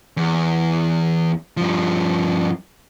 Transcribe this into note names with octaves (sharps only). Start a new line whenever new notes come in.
E2
G2 F3